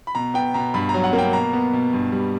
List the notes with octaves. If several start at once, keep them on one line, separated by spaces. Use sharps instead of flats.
B5
B2 A#5
B3 G5
B2 A#5
G2 B5
A#5
F#3
F#5
A#3
G5
B2 A#5
B3
B2
G2
G3